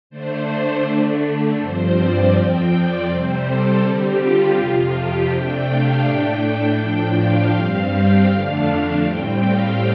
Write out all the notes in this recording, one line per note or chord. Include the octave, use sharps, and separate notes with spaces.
D3 A3 D4 C5
D3 A3 D4
G2 F3 C4 C5
D5
F2 F3 C4 G5
D5
C3 G3 C4 C5
A4
D3 G3 C4 G4
F4
F2 C3 F3 F4
G4
C3 A3 D4 G5
F5
A2 A3 D4 G5
A2 F3 D4
F5
G2 G3 C4 F5
G5
F2 D3 A3 D4 F5
F5
A2 G3 C4 G5
F5